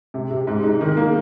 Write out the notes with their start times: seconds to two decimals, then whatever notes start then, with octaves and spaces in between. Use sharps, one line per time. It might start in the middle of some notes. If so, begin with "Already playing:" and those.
0.14 C3
0.31 C3
0.47 G#2
0.64 D#4
0.81 D#3
0.97 A#3